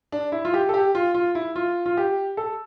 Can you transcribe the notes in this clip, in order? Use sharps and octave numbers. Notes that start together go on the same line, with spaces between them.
D4
E4
F4
G4
A4
G4
F4
F4
E4
F4
F4
G4
A4